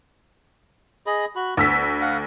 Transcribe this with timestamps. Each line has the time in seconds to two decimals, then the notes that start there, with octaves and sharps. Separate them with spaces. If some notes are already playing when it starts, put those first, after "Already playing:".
1.06 G#4 D#5 B5
1.35 F#4 B5
1.57 D2 B3 E6 B6
2.01 F5 F#5